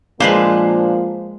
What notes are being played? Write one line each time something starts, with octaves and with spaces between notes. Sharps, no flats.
A#2 F3 G#3 A#3 D4 B4 C5 F5